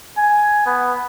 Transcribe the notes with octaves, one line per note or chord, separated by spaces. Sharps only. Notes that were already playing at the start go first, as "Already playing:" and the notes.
G#5
B3